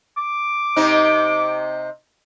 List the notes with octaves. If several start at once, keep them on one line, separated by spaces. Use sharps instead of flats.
D6
C3 C4 D#4